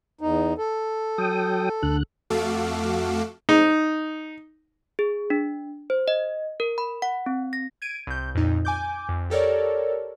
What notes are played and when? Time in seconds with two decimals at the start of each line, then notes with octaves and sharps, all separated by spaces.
0.21 E2 D#4
0.58 A4
1.18 F#3 G5 D#6
1.83 D2 D3 F#6
2.30 F2 A3 F#4 A4 F5 D6
3.49 D#4
4.99 G#4
5.30 D4
5.90 C5
6.08 D#5
6.60 A#4
6.78 B5
7.02 F#5
7.26 C4
7.53 A#6
7.82 G#6 D7 D#7
8.07 C2 G6
8.35 F2 A#2 D#4
8.65 G#5 D6 G6
9.09 F2
9.30 G4 A4 A#4 C#5 D5